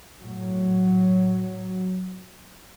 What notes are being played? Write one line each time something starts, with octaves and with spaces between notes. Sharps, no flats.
A2 F#3